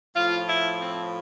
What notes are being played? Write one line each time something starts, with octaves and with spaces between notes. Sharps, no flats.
A2 F3 F4
E4
C4